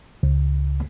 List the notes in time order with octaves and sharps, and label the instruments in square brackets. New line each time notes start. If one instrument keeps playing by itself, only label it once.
[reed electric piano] C#2